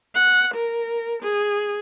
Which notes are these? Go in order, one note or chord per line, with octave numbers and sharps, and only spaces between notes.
F#5
A#4
G#4